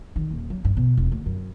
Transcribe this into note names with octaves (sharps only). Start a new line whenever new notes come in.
D#3
D#1
F#3
G2
B2
E1
D2
F#2